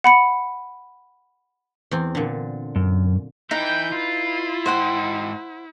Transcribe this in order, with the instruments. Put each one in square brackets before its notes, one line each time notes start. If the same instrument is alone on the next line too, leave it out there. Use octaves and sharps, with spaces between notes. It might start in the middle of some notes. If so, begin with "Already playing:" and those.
[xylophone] F#5 B5 C#7
[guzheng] E2 C4
A#2 D3
[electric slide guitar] F#2
[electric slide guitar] E3 E4 [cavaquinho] D#4 B4 [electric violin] G5 G6
[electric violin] E4 [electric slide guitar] F4
[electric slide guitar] G#2 G5 [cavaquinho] C5 F#5 C6